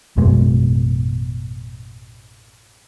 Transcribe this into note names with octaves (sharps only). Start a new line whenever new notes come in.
A1 F#2 B2 G#3